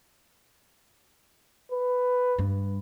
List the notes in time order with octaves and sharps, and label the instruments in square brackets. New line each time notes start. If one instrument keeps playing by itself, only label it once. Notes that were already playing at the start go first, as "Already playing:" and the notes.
[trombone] B4
[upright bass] G2